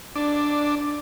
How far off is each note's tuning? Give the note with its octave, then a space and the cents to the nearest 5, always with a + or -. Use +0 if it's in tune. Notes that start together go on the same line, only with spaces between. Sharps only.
D4 +0 D5 +10